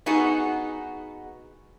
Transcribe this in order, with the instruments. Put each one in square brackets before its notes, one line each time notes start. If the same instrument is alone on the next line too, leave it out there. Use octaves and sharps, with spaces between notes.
[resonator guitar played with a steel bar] B3 D#4 F#4 G#4